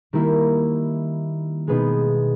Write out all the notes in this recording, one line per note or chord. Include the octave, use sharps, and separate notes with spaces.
D#3 G3 A#3 E4
B2 G#3 B3 D#4 G#4